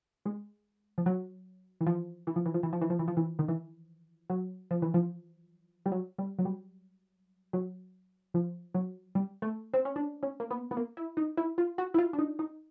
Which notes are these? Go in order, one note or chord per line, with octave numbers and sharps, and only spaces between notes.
G#3
F3
F#3
E3
F3
E3
F3
E3
F3
E3
F3
E3
F3
E3
F3
E3
D#3
E3
F#3
F3
E3
F3
G3
F#3
G3
F#3
G3
F#3
F3
F#3
G3
A3
C4
C#4
D4
C#4
A#3
B3
B3
A#3
E4
D#4
E4
F4
F#4
E4
F4
D4
D#4
D#4